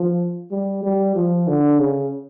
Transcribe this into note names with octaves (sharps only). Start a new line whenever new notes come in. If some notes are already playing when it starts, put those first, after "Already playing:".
Already playing: F3
G3
G3
F3
D3
C#3